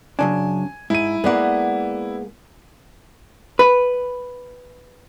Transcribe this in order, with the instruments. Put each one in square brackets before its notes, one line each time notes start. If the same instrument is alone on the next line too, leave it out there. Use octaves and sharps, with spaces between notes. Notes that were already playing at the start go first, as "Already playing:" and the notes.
[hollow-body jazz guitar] F#2 C#3 D4 [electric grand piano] G#5
[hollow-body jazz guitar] G#2 [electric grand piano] E4 D#7
[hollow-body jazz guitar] G#3 A#3 [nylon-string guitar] B3 D5 F#5
[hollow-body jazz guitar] B4